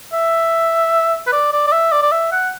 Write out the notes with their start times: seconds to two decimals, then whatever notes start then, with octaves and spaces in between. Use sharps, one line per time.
0.13 E5
1.27 B4
1.32 D5
1.52 D5
1.67 D5
1.72 E5
1.92 D5
2.02 D5
2.12 E5
2.32 F#5